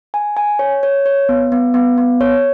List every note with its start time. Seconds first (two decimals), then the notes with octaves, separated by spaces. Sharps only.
0.14 G#5
0.37 G#5
0.59 C#5
0.83 C#5
1.06 C#5
1.29 B3
1.52 B3
1.74 B3
1.97 B3
2.21 C#5